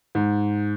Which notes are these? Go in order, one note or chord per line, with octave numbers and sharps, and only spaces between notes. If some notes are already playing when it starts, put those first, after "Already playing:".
G#2